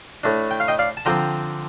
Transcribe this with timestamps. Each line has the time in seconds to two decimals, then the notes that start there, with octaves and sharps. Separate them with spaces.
0.24 A2 A3 D4
0.51 G5
0.60 F5
0.68 D#5 G5
0.79 D5 F5
0.97 A5
1.05 D3 F3 C4 G5 A#5